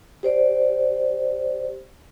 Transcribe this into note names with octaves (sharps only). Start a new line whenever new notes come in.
G4 C5 D5